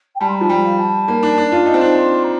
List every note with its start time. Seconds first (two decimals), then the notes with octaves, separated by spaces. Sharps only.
0.15 G5
0.20 G3 A5
0.28 C6
0.35 A#5
0.41 F3 A5
0.49 G3 G5
0.64 F5
0.79 A5
1.08 A#3
1.23 D4
1.38 D4
1.52 F4
1.66 D#4
1.74 C4
1.81 D4
1.95 C6
2.24 A#5